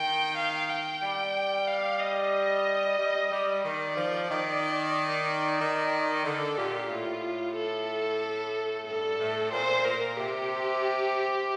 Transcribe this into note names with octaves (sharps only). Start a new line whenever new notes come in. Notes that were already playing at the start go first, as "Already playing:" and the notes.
Already playing: D#3 G5
F5
G5
G3
F5
D#5
G3
G3
D#3 D5
F3
D#3
D#3
D3 A4
A#2 G4
A2 F4
A4
G2 A4
A2
A#2 C5
A#2 A#4
C3 G4